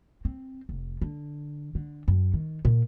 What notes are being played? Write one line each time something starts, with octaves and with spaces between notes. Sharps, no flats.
C4
F1
D3
D3
F#2
D#3
A#2